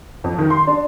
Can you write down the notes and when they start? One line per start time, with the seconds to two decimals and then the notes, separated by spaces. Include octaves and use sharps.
0.24 F2
0.38 D#3
0.50 C6
0.67 D4